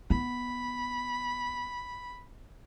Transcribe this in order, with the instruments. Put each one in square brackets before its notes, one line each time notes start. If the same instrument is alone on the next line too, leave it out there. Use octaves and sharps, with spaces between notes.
[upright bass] B3 [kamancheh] B5